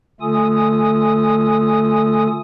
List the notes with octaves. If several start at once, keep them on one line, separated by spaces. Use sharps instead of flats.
D3 A3 F4 A4 G#5 D#6